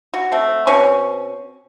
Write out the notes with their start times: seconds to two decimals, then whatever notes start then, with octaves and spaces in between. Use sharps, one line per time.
0.14 F#4
0.32 A3 C4
0.67 B2 C4 C#4 C#6